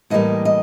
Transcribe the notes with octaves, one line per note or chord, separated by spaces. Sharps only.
A2 E3 G3 A#3 D#5
D#5